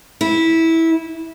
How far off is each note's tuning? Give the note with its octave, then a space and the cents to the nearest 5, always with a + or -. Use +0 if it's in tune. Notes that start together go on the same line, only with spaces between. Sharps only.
E4 -15